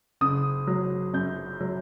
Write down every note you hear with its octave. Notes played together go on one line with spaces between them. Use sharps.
F#1 D#6
F#3
F#2 G6
F#3